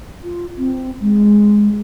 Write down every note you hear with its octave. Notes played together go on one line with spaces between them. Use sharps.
F4
C4
G#3